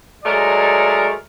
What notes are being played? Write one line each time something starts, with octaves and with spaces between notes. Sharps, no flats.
F#3 G#3 A3 A#4 C#5 D5